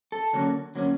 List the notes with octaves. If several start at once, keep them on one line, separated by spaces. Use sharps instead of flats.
A4
D3 F#3 A#3 C#4
D3 F#3 A#3 C#4